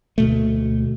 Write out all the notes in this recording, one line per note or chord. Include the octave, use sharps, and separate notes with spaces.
D2 B2 A3